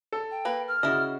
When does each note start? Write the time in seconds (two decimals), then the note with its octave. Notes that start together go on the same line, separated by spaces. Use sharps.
0.12 A4
0.31 G5
0.45 A#3 B4
0.68 F6
0.83 C#3 E4 F#4 D5 D#5